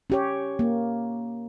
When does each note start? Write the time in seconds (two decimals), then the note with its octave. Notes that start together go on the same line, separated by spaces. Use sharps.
0.10 C#4 G4 C#5
0.59 A#3